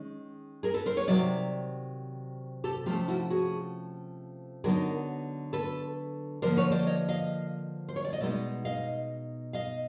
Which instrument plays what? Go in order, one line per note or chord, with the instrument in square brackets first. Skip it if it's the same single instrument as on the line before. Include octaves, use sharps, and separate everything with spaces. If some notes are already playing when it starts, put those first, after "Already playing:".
Already playing: [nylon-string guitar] D#3 G#3 C#4
G#4 A#4
A4 B4
A#4 C5
B4 C#5
C3 D#3 F#3 D5 E5
G4 A4
C3 F3 A3 C#4 F4 G4
E4 F#4
F#4 G#4
D3 F#3 B3 D#4 G#4 A#4
A4 B4
D3 F3 A#3 A#4 C5
B4 C#5
C5 D5
C#5 D#5
D#5 F5
C5
C#5
D5
D#5
B2 G#3 B3 D#4 D5 E5
D#5 F5
D#5 F5